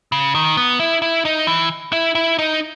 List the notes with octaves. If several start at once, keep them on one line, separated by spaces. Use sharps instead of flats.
C#3
D#3
B3
E4
E4
D#4
E3
E4
E4
D#4